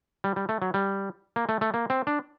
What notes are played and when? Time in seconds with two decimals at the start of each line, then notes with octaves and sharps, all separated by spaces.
0.24 G3
0.36 G3
0.49 A3
0.62 F#3
0.74 G3
1.36 A#3
1.49 A3
1.61 A3
1.74 A#3
1.90 C4
2.07 D4